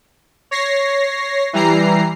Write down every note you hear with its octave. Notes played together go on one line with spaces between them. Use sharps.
C#5 A#6 C7
E3 G3 A#5 C7